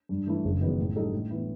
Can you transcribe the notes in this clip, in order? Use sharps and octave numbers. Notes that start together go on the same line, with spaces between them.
G2
E3 A3 E4
F#1
E2 D#3 F#3 B3
A2
G3 D#4 A4 D#5
A2
E3 B3 E4